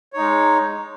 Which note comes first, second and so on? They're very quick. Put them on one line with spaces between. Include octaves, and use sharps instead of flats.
C#5 D#4 G#3